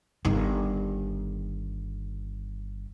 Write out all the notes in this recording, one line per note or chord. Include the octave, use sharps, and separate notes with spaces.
G1 D#3